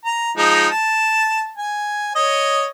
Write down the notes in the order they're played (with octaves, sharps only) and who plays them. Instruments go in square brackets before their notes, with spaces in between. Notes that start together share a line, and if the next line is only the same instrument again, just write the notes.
[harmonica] A#5
F3 G#3 D#4
A5
G#5
C#5 D#5